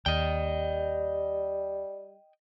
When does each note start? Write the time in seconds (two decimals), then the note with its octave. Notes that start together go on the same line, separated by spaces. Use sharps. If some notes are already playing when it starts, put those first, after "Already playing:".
0.06 D#2 G3 D#5 G5